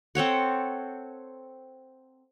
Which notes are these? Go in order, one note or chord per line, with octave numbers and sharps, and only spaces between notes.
C4 A4 C#5 F#5